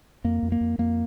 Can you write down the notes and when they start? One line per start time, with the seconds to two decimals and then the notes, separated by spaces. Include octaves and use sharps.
0.24 F2 A#3
0.42 F2
0.52 A#3
0.61 F2
0.78 F2 A#3